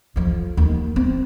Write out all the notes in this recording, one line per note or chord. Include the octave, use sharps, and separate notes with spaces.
F2 F3
D#2
C4